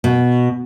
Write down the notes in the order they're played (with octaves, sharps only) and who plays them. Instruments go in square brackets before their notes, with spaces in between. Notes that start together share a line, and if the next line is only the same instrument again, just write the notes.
[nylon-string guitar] B2